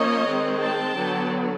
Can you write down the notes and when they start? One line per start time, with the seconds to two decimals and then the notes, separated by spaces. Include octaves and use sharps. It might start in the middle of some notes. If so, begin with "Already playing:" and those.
Already playing: F3 A#3 C#4 C#5 D#5
0.26 D#3 G#3 C4
0.61 G5 A5
0.96 D3 F#3 B3